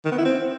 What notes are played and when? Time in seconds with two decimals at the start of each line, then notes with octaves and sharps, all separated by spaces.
0.05 D#3
0.12 B3
0.18 E4
0.25 C4